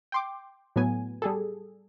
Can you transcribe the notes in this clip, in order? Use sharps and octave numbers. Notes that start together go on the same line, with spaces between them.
G5 C6 D6
A2 F#3 B3 G#5
G3 G#4 A4